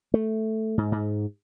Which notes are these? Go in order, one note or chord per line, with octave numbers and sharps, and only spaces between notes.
A3
G#2
G#2